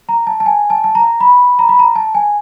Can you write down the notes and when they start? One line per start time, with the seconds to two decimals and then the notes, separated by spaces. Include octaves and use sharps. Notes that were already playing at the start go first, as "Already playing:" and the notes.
0.09 A#5
0.27 A5
0.40 A5
0.46 G#5
0.70 A5
0.84 A5
0.95 A#5
1.21 B5
1.59 A#5
1.69 B5
1.79 A#5
1.95 A5
2.15 G#5